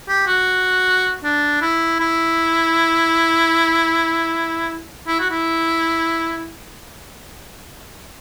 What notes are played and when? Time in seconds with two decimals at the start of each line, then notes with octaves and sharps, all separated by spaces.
0.09 G4
0.27 F#4
1.24 D4
1.61 E4
2.00 E4
5.07 E4
5.19 F#4
5.30 E4